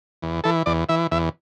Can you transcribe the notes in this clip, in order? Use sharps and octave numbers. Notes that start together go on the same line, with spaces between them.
E2
E3 A4
E2 D5
E3 E5
E2 E5